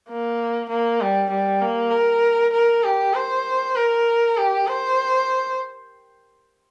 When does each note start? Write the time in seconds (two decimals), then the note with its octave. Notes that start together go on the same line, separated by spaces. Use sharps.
0.09 A#3
0.69 A#3
1.01 G3
1.31 G3
1.62 A#3
1.92 A#4
2.53 A#4
2.84 G4
3.14 C5
3.76 A#4
4.37 G4
4.67 C5